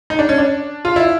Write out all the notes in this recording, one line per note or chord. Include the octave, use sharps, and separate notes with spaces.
D#4
D4
C#4
D4
F4
E4